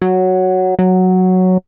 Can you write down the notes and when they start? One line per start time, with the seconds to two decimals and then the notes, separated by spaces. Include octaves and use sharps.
0.01 F#3
0.79 F#3